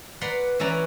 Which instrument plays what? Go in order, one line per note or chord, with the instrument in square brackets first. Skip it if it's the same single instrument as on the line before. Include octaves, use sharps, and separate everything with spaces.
[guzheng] B4 D5 F#5 A#5 C6
E3 C#4 E4 D5 A#5